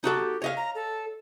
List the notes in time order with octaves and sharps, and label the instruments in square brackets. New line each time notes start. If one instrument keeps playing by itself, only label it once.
[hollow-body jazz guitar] D#4 F#4 A4 [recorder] G4
[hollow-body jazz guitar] C#5 D#5 F5
[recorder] A#5
A4